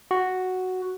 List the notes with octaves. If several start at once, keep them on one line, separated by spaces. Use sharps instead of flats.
F#4